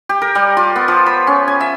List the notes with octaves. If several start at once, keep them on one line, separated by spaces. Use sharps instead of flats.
G4
A#4
G3
F4
B3
F3
B5
C#4
G#5
E5